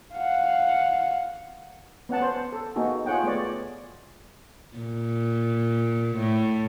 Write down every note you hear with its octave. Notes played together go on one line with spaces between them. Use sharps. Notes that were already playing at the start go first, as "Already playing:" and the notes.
F5 F#5
B3 C#4 F#5 A5
C5
A4
A#3 B3 D#4 F#4 G#4
F4 G#4 C#5 F#5 G5
A3 B3 G#4 C#5 D5
A#2
A2